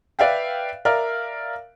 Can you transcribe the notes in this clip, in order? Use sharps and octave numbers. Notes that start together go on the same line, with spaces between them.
B4 D5 E5 F5 G5
A#4 D5 E5 F5 F6